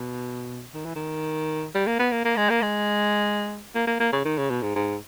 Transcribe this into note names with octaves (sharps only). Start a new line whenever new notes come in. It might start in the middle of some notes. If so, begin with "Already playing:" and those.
Already playing: B2
D#3
E3
D#3
G3
A#3
B3
A#3
A#3
G#3
A#3
G#3
A#3
A#3
A#3
C#3
D#3
C#3
B2
G#2
G#2